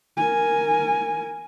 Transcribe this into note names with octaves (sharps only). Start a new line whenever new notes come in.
A#4 G#5